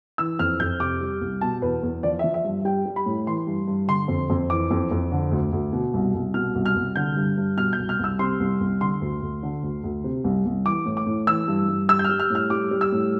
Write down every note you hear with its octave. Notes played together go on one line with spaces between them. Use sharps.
E3 E6
F2 F6
F2 G6
C3 D6
G3
C2
B2 A5
E2 B4
E2
F3 D5
F3 E5
E5
G2
G3 G5
G3
B5
A2
E3 C6
G2
G2
D3 C6
F2
F2
E3 D6
F2
F2
D3
D2
D2
B2
C2
C2
B2 F6
C2
F6
C2
D3 G6
G2
G2
B2 F6
G6
C2
F6
C2 E6
C3 C6
C2
C2
D3 C6
D2
D2
D3
D2
D2
C3
C2
C2
E3 D6
A2
D6
A2
E3 E6
G2
G2
G3 E6
G6
G3 F6
F6
A2 F6
G3 D6
G3
E6
A2